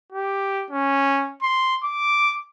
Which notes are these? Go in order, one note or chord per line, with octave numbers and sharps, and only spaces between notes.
G4
C#4
C6
D6